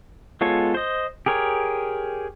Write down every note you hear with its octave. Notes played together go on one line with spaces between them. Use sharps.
G#3 B3 F4 A4 C#5
C5 D#5
G4 G#4 A#4 C#5